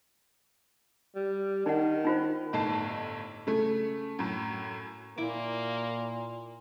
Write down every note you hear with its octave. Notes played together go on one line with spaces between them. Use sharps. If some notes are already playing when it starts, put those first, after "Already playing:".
G3
D#3 D#4 F#5
D#4 F4 C5
G1 A2 D#4 A5 C7
C#3 A3
F#2 A2
A#2 A#3 E4 D6